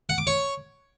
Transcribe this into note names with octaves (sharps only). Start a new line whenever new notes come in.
F#5
D6
C#5